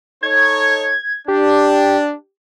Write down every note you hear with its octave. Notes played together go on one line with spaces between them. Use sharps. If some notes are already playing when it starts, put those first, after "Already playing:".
D#4 A4 C#5 G#6
D4 G4